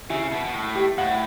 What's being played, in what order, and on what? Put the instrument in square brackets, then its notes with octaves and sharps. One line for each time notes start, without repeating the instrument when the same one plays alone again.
[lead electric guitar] C#3 [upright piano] E4
[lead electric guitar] B2
B2
A2
[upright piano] G4
[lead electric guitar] A2 [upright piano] F#5